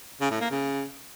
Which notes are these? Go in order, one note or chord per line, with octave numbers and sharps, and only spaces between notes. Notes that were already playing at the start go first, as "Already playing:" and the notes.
C#3
A2
A#3
C#3